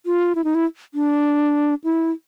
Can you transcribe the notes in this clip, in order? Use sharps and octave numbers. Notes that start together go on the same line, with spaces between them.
F4
E4
D#4
E4
D4
E4